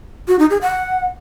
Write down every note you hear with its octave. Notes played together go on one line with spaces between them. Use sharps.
F#4
D#4
G#4
F#5